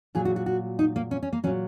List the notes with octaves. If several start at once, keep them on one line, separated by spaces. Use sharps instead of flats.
A#2 F#3 G#4
F#4
F#4
F#4
D#4
A#3
C#4
C#4
A#3
A#2 F#3 C#4